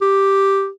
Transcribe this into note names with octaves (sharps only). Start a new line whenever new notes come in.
G4